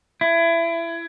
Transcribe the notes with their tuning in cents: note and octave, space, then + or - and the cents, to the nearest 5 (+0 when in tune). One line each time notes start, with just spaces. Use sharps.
E4 +25